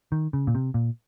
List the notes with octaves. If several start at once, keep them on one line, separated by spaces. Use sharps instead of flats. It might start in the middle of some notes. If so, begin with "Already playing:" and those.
D#3
C#3
A#2
C3
A#2